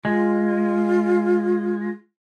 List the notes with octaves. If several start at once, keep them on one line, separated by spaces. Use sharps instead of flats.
G#3 F4